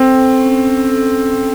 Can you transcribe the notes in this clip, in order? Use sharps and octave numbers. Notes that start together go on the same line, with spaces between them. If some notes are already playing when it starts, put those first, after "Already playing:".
Already playing: C4 A4
A4
C#4
C#4
A4